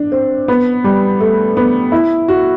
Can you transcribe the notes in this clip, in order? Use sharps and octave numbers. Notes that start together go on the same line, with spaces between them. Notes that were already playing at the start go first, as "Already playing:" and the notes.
Already playing: D4
C4
B3
G3
A3
B3
E4
F#4